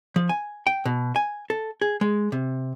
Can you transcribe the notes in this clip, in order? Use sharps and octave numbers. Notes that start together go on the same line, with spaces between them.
F3
G#5
G5
B2
G#5
A4
G#4
G#3
C3